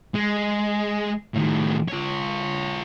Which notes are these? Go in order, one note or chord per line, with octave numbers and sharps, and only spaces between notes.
G#3
A2 D#3
F4 C#5